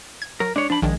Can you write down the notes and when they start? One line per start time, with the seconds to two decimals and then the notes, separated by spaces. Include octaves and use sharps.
0.22 G#6
0.40 F#3 A#4
0.56 G#3 D4 C#5
0.70 F3 D4 B5
0.82 A#1 D#3 G#3 D4